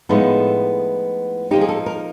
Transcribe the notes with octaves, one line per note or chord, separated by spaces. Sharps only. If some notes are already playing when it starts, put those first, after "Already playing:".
A2 F3 G#3 B3 D#4 A4
F3 A#3 D#4 G4
G#4
A4
A#4